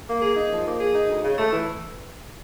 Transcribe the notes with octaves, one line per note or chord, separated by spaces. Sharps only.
A#3
G#4
D#4
F3
A#3
G#4
D#4
D2
C#3
A3
E3